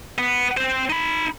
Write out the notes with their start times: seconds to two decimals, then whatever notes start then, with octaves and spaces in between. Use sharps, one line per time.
0.18 B3
0.57 C4 C5
0.90 D#4 B5